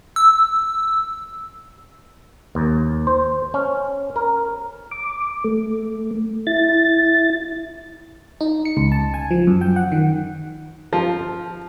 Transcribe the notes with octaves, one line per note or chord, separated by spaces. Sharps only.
E6
D#2
C5
C#4
A#4
D6
A3
E4 A6
D#4
C#7
C#2
A5
G#5
F3
F#2
G5
F#5
D#3
F3